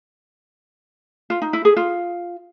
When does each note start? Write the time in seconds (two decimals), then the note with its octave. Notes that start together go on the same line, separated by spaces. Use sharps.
1.30 F4
1.42 D#4
1.53 E4
1.65 G#4
1.77 F4